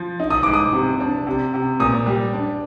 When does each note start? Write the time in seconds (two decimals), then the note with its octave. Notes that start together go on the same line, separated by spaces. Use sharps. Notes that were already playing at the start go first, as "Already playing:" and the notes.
Already playing: F3
0.20 D#4
0.30 D#6
0.43 G#2 D6
0.54 D#6
0.73 C3
1.00 D4
1.27 C3
1.54 C3
1.80 A#2 D#6
2.06 G3
2.33 D4